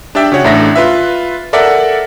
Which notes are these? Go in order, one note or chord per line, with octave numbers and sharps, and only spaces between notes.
D4 G4 D5 E5 G5
C#3 F#4 C#5 F#5
A1 A2 D4 E5 E6 A#6
F4 B4 E5
A4 A#4 D5 E5 F#5